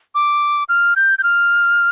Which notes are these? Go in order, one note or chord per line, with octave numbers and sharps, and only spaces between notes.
D6
F6
G6
G6
F6